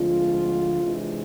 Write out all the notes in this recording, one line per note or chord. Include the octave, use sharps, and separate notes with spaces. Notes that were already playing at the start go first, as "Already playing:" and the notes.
Already playing: D2 D3 F3 G#3 C4 F4
C3 E3 G#3 D4